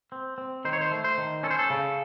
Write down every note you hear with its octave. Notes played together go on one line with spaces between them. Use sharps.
C4
C4
D#3 C5
C#5
C5
A3
C5
D#3
C#4 A4
C5
A4
C#3